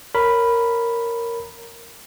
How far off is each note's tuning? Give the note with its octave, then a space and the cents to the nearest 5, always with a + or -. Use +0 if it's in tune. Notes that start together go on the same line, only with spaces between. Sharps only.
A#4 -5 C#5 +0 B5 +0